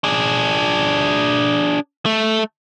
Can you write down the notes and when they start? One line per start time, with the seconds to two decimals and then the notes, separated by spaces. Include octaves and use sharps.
0.04 D4 G#4
2.06 A3